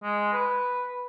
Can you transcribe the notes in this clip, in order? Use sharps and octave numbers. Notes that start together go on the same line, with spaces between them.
G#3
B4